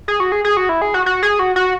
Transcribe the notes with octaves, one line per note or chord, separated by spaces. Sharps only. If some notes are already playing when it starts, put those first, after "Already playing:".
G#4
F#4
G#4
G#4
F#4
E4
G#4
F#4
F#4
G#4
F#4
F#4